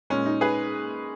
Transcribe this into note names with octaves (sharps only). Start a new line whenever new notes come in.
A#2 G#3 C#4
D#4
G#4 B4